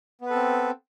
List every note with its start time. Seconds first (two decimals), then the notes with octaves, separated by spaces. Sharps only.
0.21 B3
0.26 B4
0.30 A4
0.34 C4